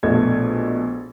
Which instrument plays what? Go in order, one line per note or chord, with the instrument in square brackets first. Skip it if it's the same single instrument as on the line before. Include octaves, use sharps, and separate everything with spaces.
[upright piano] A#1 B2 A3 D#5 G#6